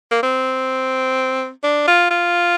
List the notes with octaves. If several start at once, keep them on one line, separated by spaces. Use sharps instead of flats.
A#3
C4
D4
F4
F4